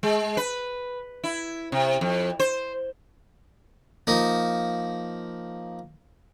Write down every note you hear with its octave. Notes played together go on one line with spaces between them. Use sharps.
G#3
B4
E4
C3
F2
C5
F3 A#3 D#4